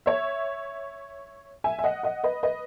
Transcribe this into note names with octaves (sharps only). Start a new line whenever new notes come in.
C#5 E5
E5 G#5
E5
D#5 F#5
D#5 F#5
B4 D#5
B4 D#5